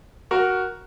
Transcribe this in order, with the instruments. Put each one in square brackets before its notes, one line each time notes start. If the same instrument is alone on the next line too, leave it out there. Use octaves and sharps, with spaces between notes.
[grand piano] F#4 A#4